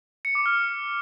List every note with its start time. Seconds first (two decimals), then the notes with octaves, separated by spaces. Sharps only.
0.25 C#7
0.35 D6
0.46 F6